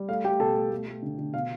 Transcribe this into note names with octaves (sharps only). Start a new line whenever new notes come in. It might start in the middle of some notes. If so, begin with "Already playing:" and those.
Already playing: G3
A3 F5
A3 G4 G5
B2 A4 A5
A3
A3
A3
D3
D3
B2 F5